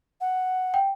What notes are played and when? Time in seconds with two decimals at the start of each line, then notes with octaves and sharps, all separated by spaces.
0.21 F#5
0.74 G5